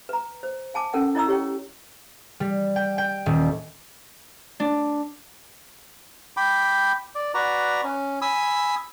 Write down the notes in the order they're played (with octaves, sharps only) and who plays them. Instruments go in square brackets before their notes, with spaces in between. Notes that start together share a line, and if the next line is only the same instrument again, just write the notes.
[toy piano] B4 A#5
C5
F5 G#5 A5 D6
C#4 A4 A#4 F#5 G5
E4 C#5 D#5 A#5 D#6 E6
G4 C#5 G5
[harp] G3
G5
G5
D#1
D4
[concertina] G5 B5 D6
D5
F#4 B4 D5 A#5
C#4
G#5 B5 D#6 E6